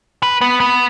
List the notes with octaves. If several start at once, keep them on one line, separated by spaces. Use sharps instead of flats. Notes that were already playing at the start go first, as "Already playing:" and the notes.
B4
B3
B3